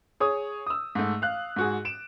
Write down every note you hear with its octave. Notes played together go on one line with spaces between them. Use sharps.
G#4 C#5 D#6
D#6 E6
G#2 A3
F5 F#6
G#2 F#4 G#4
D7 E7